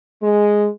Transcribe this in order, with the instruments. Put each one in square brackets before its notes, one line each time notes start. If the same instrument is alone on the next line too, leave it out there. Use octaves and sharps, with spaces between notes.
[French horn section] G#3